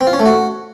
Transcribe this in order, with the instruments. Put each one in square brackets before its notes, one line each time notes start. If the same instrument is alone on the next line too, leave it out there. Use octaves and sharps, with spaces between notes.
[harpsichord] C4
F4
C#4
A3
F#4